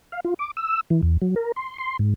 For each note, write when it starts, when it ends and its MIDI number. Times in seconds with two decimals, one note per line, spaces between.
0.12 0.20 77
0.25 0.34 65
0.39 0.51 86
0.57 0.81 88
0.90 1.01 52
1.03 1.17 40
1.22 1.35 54
1.36 1.52 70
1.56 1.77 84
1.78 1.97 84
1.99 2.14 44